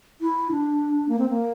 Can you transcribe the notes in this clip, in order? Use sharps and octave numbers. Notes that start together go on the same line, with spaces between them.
E4
D4
A#3
C4
A#3